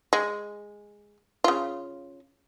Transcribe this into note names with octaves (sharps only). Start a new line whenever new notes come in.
G#3
C#3 F4